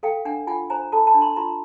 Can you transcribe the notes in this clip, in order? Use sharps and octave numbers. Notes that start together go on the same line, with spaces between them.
A4 F5 G5
D4 F#5 G#5
F4 F#5 G#5
C5 G#5 A#5
A4 A5 B5
A5 B5
D4
A#5 C6
F4 A#5 C6